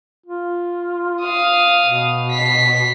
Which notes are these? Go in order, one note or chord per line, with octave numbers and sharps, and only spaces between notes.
F4
F5 D#6
B2
B6 C7